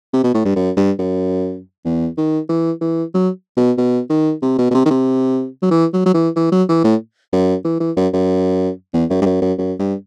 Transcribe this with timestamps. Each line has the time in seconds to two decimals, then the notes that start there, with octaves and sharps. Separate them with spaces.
0.13 C3
0.24 B2
0.34 A2
0.45 G2
0.56 F#2
0.77 G2
0.99 F#2
1.85 E2
2.17 D#3
2.49 E3
2.81 E3
3.14 F#3
3.57 B2
3.78 B2
4.10 D#3
4.42 C3
4.58 B2
4.71 B2
4.74 C3
4.86 D#3
4.90 C3
5.62 F#3
5.71 E3
5.93 F#3
6.06 F#3
6.14 E3
6.36 E3
6.52 F#3
6.69 E3
6.84 A2
7.33 F#2
7.65 E3
7.80 E3
7.97 F#2
8.13 F#2
8.94 E2
9.10 F#2
9.22 G2
9.26 F#2
9.42 F#2
9.58 F#2
9.79 G2